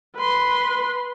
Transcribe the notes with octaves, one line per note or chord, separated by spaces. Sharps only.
B4 C6